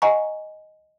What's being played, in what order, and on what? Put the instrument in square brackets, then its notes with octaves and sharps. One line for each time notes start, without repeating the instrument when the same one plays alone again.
[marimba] D#5 F#5 G#5 A#5 C#6